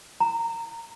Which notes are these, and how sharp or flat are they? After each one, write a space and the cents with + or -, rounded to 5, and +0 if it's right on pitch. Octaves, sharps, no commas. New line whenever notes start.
A#5 -20